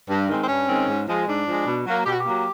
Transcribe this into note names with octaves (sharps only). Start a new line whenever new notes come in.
G2
D#3 G#3 C4
C4
G2 C#4
D#3 G#3 C4
G#2
F3 G#3
G#2 D4
F3 G#3
B2
F#3 A#3
B2 G4
F#4
G4
F#3 A#3